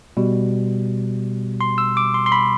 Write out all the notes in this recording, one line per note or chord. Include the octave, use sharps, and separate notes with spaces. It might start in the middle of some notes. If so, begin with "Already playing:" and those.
B2 G3
C6
E6
D6
C6
C6
B5